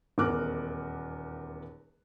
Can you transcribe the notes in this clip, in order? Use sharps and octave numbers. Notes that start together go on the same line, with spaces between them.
D#1 E2 A#4 D6 F6 F#6